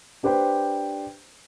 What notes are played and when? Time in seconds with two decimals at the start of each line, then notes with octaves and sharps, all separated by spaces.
0.23 D4 G4 B4 C5 G5